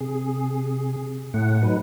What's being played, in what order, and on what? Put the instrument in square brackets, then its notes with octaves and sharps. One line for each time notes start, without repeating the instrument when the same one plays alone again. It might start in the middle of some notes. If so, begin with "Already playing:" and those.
[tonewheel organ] C3 G#4
[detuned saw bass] A2 [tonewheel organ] F#5
[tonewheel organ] F#3 D#4 B4